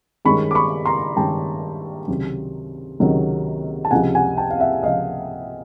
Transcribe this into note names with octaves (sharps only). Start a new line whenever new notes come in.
G2 D#3 G#3 C#4 B5 C#6
D6
B5 C#6
A#5 C6
G2 D#3 G#3 C#4 G5 A5
C#2 C3 D#3 F#3
C#2 C3 D#3 F#3
A5
C#2 C3 F3 F#5 G#5
F#5 G#5
G5 A5
F5
E5 F#5
C#2 C3 F3 D#5 F5